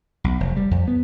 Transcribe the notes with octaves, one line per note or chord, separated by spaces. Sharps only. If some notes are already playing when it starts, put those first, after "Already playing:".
B1
F1
G3
F2
B3